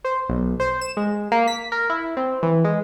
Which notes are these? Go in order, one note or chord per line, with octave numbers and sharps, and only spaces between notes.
C5
B1
C5
E7
G#3
A#3
B6
A#4
E4
C4
E3
G#3